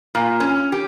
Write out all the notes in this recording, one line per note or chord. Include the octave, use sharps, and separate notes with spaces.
A#2
C#4
G4